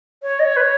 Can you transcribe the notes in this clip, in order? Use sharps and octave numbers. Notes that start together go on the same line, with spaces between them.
C#5
D#5
C#5
B4
C#5